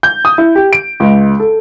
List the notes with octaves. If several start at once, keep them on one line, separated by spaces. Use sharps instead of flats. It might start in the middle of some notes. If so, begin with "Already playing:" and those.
G6
D#6
E4
G4
D7
C#2
A4